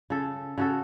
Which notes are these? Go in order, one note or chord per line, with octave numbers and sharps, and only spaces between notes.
C#3 A4
C#3 F#4 A4